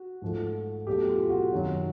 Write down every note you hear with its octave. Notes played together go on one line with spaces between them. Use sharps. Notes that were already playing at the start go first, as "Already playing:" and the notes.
Already playing: F#4
G#2 F3 A3
B2 F#3 A3 G4
F4
F4
F#4
F#2 D#3 F#3